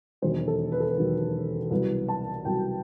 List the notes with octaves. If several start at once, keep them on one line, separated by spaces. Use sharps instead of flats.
E1 D#2 D#3 F#3 C5
A4
B4
A4
B4
E1 D#2 D#3 F#3
C2 B2 F#3 B4
A5
C2 B2 F#3 G5